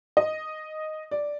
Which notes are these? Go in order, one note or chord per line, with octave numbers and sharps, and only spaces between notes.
D#5
D5